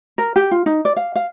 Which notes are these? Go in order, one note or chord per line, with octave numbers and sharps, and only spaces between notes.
A#4
G4
F4
D#4
D5
F5
F5